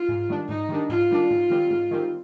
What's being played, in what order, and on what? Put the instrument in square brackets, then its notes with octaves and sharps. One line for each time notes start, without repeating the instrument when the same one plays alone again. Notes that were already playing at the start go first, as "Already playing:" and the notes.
Already playing: [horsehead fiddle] F4
[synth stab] G#2
D#3 G3 D4
[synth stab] G#2 [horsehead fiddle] D#4
[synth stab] D#3 G3 D4
[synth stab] G#2 [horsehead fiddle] F4
[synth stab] D#3 G3 D4
G#2
D#3 G3 C4
G#2
D#3 G3 C4